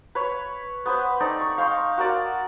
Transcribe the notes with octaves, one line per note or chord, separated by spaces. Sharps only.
B4 C#5
B3 B4 C5
A3 C4 D#4 D5
C#6
F5 G5 C6 C#6
F#4 A#4 D5 F#5